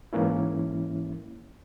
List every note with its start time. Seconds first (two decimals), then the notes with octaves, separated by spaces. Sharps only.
0.13 G#2 E3 A#3 C#4 E4